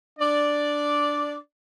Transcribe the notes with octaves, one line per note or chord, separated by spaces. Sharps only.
D4 D5